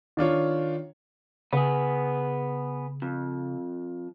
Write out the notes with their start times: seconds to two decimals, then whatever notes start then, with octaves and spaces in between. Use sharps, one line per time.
0.17 D#3 D4 F4 C#5
1.53 C#3 B3 G#4
3.02 F2